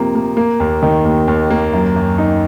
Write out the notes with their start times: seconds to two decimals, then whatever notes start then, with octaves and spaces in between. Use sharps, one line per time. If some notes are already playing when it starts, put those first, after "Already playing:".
Already playing: C3 F3 A#3
0.15 A#3
0.37 A#3
0.60 D#2
0.83 D#3
1.05 D#2
1.28 D#2
1.51 A#3
1.73 F#2
1.96 F#2
2.18 D#4